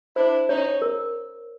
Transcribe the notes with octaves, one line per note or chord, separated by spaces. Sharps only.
D4 E4 C5
C#4 D#4 C#5
A#4